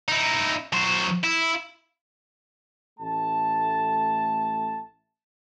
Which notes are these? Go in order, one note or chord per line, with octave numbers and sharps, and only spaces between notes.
D#4 E4
F#3 C5
E4
A1 A3 A5